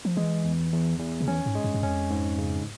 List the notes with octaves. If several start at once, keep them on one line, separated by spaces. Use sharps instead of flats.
F3
E3 G#3
E2
E2
E2
C#3
E3 C#4
G#2
G#3
G2
G2
F2 C#4
G#2
C#3